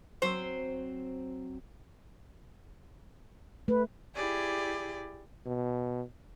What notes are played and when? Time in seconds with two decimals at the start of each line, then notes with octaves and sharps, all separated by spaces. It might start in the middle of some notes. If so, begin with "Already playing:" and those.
0.22 F#3 C4 C5
3.68 A3 B4
4.14 E4 G4 G#4 D5
5.46 B2